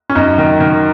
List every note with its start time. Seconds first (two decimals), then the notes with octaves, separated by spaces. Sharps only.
0.10 C#4
0.15 F#2 D#4
0.38 D#3
0.60 D#3